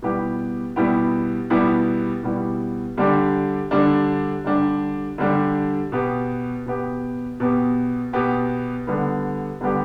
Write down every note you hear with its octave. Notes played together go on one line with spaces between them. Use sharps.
B2 G3 B3 E4 G4
B2 G3 B3 E4 G4
B2 G3 B3 E4 G4
B2 G3 B3 E4 G4
D3 G3 D4 G4
D3 G3 D4 G4
D3 G3 D4 G4
D3 G3 D4 G4
B2 B3 G4
B2 B3 G4
B2 B3 G4
B2 B3 G4
D3 G3 B3 G4
D3 G3 B3 G4